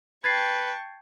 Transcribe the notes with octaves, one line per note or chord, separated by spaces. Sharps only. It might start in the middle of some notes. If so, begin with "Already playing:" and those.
B4 G5 A5 C#6 G#6 A6 C7